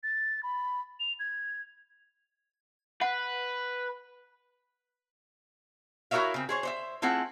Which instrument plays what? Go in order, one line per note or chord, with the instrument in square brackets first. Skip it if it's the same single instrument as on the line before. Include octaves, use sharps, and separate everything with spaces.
[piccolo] A6
B5
F7
G#6
[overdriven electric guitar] B4 [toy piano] F#5
[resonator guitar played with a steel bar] E4 F#4 A#4 C#5 E5 F5
C#3 C4
G#4 C5 C#5
C5 C#5 E5
A3 C4 E4 F4 G#4 F#5